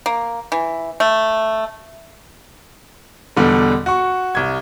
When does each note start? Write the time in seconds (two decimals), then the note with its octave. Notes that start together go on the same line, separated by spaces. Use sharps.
0.06 A#3
0.52 E3
1.00 A3
3.36 E2 B2 D3 G3
3.86 F#4 C#6
4.35 C2 G#6